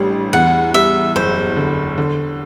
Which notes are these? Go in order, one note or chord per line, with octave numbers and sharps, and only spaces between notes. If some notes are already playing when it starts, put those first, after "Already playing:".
Already playing: A1 A2 G3 D4
E2 F#5
G3 E5
F#1 C5
D3
D3